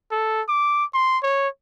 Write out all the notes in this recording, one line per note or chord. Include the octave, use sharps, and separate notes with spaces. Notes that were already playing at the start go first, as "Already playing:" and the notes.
A4
D6
C6
C#5